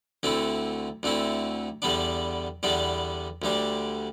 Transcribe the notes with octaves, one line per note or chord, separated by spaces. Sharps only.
D2 D3 A3 C4 E4
D2 D3 A3 C4 E4
E2 D3 G3 B3 D4
E2 D3 G3 B3 D4
D2 D3 G3 D4